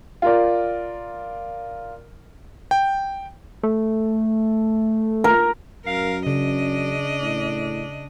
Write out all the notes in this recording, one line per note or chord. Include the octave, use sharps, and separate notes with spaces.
F4 A#4 D5
G5
A3
A#4
F#2 A#4 F5
C#3 D4 D#5
A2